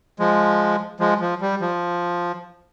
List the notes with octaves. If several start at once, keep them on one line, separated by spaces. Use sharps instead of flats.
F3 G#3
F3 G#3
F3
G3
F3